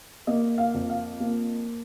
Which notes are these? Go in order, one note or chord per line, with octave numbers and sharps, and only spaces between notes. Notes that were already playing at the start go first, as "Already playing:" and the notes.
A#3 D#5
F5
F2
F5
A#3